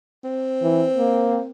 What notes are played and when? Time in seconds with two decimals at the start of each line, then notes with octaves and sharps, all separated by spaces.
0.24 C4
0.62 E3
0.97 A#3